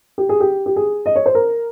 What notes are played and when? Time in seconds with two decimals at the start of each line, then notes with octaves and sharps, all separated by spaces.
0.18 G4
0.29 G#4
0.40 G4
0.66 G4
0.76 G#4
1.06 D#5
1.16 C#5
1.26 C5
1.35 A#4